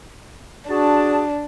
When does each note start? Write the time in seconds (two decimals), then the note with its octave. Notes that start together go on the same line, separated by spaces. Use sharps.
0.69 D4 F#4 G#4 A5